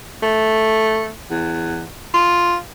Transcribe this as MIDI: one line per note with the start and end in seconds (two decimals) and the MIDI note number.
0.23 1.14 57
1.30 1.87 40
2.14 2.57 65